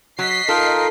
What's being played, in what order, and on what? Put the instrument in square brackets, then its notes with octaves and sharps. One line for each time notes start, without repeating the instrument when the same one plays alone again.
[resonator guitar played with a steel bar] F#3 [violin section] D#5 B6 C7
[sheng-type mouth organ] D#4 F4 A#4 [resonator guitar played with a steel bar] A4